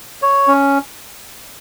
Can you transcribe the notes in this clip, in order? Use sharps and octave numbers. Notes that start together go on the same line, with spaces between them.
C#5
C#4